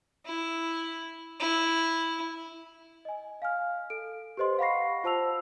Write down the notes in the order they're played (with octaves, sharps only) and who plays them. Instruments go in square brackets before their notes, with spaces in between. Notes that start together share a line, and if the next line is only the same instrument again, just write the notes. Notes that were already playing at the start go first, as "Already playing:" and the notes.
[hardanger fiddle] E4
E4
[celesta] D#5 G#5
F5 G#5 F6
A4 D7
G4 B4 C5 D#5 C6
F5 F#5 B5 C#6 A#6 C7
F4 C5 A5 E6 F7